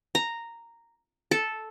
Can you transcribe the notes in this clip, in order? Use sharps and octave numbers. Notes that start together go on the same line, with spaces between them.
A#5
A4